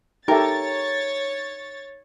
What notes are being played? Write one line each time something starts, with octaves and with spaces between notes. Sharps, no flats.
D#4 G4 A4 A#4 C#5 E5 A6